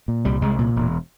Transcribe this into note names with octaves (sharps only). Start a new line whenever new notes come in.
A#2
C2 G3
C2 G#3
A#2
E1